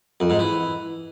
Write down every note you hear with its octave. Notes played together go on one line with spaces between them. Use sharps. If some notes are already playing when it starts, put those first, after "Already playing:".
F2
G#2
E3